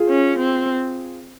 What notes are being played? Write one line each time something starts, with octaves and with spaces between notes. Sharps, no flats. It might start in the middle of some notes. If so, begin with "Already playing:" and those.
Already playing: F4 G#4
C#4
C4